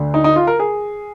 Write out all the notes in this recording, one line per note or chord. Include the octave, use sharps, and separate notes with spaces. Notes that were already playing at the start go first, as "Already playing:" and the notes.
Already playing: D2 D3
D#4
D#4
F4
A#4
G#4